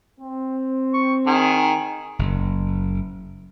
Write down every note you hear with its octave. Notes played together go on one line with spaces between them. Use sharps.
C4
C#6
D#3 G#4
F#1